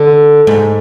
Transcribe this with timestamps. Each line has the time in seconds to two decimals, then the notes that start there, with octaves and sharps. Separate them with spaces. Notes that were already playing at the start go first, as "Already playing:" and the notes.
Already playing: D3
0.47 G#2